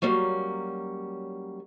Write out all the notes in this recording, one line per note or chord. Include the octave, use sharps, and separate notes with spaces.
F#3 G3 A#3 C#4